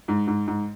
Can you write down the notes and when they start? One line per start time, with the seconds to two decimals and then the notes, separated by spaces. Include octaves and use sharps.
0.08 G#2
0.27 G#2
0.47 G#2